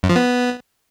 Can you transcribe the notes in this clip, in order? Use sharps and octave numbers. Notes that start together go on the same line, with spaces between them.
F#2
F3
B3